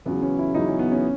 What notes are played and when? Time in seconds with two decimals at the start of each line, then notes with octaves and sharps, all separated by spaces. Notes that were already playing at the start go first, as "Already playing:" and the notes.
0.05 E2 C#3 F#3 B3
0.22 C#4
0.39 E4
0.54 E2 C#3 F#3 D#4
0.67 C#4
0.79 B3
0.91 C#4